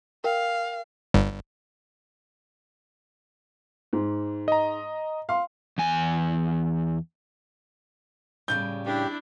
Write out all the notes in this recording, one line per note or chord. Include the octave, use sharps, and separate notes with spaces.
A#4 F5 G5
G1 G2
G#2
D#5 A#5
F5 C6
E2 G#5
A2 C#3 G3 G6
D4 E4 G4